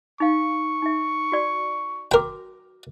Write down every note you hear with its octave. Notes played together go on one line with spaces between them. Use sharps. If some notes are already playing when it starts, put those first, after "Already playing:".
D#4 F5 C#6
D#4 E5
F#4 D5
F#4 A#4 G5 D6